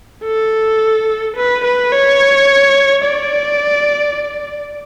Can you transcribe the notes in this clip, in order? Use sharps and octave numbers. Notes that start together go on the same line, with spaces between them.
A4
B4
B4
C#5
D5